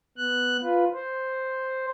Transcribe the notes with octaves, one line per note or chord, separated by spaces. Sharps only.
B3 F#6
F4 B4
C5